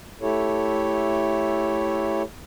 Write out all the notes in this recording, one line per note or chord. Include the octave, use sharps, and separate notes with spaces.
A3 E4 G4 A4 C#5